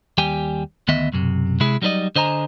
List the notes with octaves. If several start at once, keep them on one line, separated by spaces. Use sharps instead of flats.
D#2 G3 G4 G5 G#5
D2 D#3 B3 D#5 E5
B1 F#2 A2 C3
C3 G#3 E4 G#4
F#3 G3 D#4 A#4 D5 D#5
D3 C5 D#5 G#5 A#5